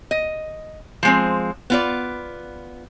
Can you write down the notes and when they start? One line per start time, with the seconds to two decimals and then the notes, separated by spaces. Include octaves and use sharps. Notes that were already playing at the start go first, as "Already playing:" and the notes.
0.11 D#5
1.03 F3 G#3 C4
1.70 B3 F4 D5